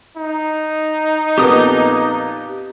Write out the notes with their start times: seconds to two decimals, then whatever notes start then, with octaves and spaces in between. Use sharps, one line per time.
0.17 D#4
1.38 F2 A#2 B3 G4 D#6